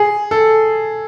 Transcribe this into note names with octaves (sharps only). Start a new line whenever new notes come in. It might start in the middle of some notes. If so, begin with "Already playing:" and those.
Already playing: G#4
A4